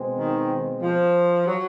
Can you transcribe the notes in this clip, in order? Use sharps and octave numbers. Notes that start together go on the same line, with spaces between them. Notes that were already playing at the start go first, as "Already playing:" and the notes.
Already playing: B2 G#3 C4
D#3
F3
F#3